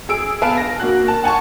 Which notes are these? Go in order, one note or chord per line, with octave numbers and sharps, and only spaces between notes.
G#4 E6 D7
B3 B4 F5 G#5 A5 D7
A#6
A#3 F#4 F#6
A5
F#5 G#5 A5 C#6